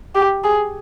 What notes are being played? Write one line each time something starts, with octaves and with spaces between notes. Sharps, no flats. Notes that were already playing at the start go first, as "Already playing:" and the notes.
G4
G#4